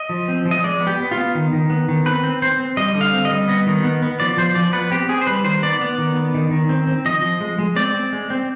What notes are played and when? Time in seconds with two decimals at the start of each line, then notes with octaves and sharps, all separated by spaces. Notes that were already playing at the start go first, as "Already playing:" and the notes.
Already playing: D#5
0.09 F3
0.28 C4
0.45 F3
0.51 D#5
0.64 G#3 D5
0.81 B3
0.87 G4
0.99 B3
1.11 F4
1.17 B3
1.35 D#3
1.53 D#3
1.70 B3
1.88 D#3
2.06 C4 B4
2.24 C4
2.42 C4 C5
2.60 C4
2.77 G3 D#5
2.95 D3
3.01 F5
3.13 C4
3.25 D#5
3.31 G3
3.48 B3 D#5
3.66 D#3
3.84 B3
4.02 B3
4.20 F3 D5
4.37 F3 C5
4.55 F3 D5
4.73 B3 B4
4.91 C4 G4
5.09 C4 G#4
5.21 C5
5.27 G3 B4
5.44 D#3 C5
5.62 B3 D5
5.81 B3
5.98 D#3
6.16 B3
6.34 D#3
6.51 D#3
6.69 C4
6.87 C4
7.05 F3 D#5
7.22 F3
7.40 G#3
7.59 G#3
7.76 C4 D5
7.94 C4
8.13 G#3
8.30 C4